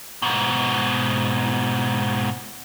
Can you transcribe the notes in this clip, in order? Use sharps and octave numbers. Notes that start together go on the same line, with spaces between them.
G#2 B2